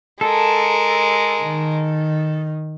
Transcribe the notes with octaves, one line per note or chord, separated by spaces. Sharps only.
G#3 A4 A#4
D#3